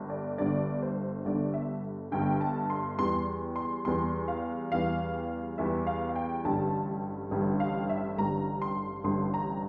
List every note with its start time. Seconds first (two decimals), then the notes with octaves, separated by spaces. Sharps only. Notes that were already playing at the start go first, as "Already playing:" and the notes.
Already playing: G1 G2
0.10 D5
0.38 G1 G2 D3 D5
0.82 C5
1.25 G1 G2 D3 D5
1.54 E5
2.12 G1 G2 D3 G5
2.41 A5
2.70 C6
2.99 E2 E3 G3 C6
3.56 C6
3.85 E2 E3 G3 C6
4.28 F5
4.72 E2 E3 G3 F5
5.58 E2 E3 G3 E5
5.87 F5
6.09 F5
6.16 G5
6.45 A1 G2 D3 G3 A5
7.31 A1 G2 D3 G3
7.60 F5
7.89 E5
8.18 A1 G2 D3 G3 A#5
8.62 C6
9.04 A1 G2 D3 G3 C6
9.34 A#5